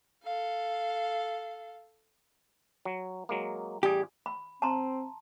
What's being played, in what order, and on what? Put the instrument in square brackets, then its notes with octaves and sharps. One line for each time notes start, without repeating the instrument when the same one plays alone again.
[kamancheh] A4 F5
[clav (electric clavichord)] F#3
F#3 G#3 A#3
[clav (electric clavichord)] A1 G3 G#4 [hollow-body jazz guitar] G4
[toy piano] B5
[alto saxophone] C4 [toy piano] A5 A#5 C6